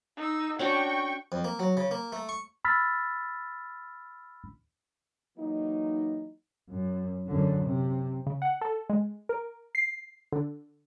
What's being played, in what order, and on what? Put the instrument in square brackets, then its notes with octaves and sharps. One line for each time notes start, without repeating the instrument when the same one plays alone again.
[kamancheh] D#4 E6
[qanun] C#4 D4 F#4 [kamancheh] G5 C#6
[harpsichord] F2
A#3
F#3
C#3
A#3
A3
C#6
[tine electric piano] B5 E6 F6 A6 B6
[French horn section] E3 F#3 A#3 D#4
[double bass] F#2
F#2 D3
C3
[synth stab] C#3
F#5
A4
G#3
A#4
C7
D3